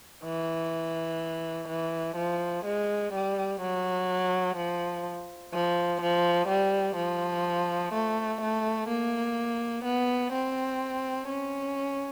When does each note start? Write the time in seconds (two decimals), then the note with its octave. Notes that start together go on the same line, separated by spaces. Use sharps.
0.24 E3
1.69 E3
2.16 F3
2.65 G#3
3.13 G3
3.61 F#3
4.57 F3
5.53 F3
6.01 F3
6.48 G3
6.96 F3
7.93 A3
8.41 A3
8.89 A#3
9.85 B3
10.33 C4
11.28 C#4